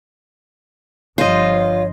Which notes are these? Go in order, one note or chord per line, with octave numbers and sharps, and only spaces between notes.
G1 G2 F3 F4 C5 C#5 D#5